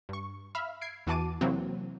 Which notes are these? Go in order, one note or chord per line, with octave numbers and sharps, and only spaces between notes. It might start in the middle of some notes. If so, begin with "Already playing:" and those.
G2 C#6
E5 F5 B5 F6
G#6 C7 D7
E2 E3 F#4 A5 D6 D#7
C3 E3 F#3 A#3 C4